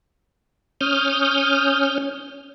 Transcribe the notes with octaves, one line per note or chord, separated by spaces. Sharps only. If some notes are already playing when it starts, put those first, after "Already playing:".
C#4 D#6 F6 G6